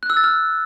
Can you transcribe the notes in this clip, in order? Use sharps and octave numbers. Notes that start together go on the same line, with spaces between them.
F#6
E6
A6
F6